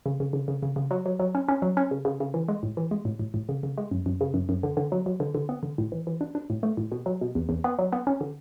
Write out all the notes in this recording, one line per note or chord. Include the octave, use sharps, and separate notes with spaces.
C#3
C#3
C#3
C#3
C#3
C#3
F#3
F#3
F#3
C#4
C#4
F#3
C#4
C#3
C#3
C#3
E3
G#3
A2
E3
G#3
A2
A2
A2
C#3
C#3
G#3
F#2
F#2
C#3
F#2
F#2
D3
D3
F#3
F#3
D3
D3
B3
D3
A2
E3
E3
D4
D4
A2
A3
A2
B2
F#3
B2
E2
E2
B3
F#3
B3
C#4
D3